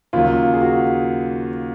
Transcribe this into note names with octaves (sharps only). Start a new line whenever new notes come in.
D#2 C#3 F#3 F4
G#4
F#4